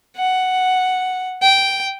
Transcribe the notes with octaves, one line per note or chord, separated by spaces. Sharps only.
F#5
G5